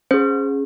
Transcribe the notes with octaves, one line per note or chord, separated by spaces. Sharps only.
C#4 G#4 C5